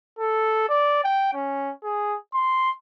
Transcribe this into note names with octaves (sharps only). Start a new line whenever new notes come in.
A4
D5
G5
C#4
G#4
C6